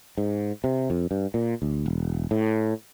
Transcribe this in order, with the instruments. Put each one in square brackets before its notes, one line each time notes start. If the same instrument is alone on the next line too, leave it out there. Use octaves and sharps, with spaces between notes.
[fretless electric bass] G#2
C3
F2
G2
A#2
D2
E1
A2